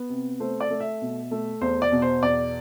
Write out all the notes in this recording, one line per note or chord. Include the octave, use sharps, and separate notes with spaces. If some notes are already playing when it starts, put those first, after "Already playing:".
Already playing: B3
C3
A3 C5
D5
A3
E5
B2
A3
E2 C5
D5
B2
C5
E2 D5